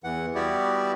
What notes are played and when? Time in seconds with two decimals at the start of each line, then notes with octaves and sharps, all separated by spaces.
0.04 E2 E3 F#5
0.35 G3 B3 E4 F#4 G4 D5